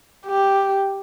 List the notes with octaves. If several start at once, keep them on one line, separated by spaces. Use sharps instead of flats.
G4